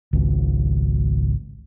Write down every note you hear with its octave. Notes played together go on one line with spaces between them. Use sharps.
G#1 C#2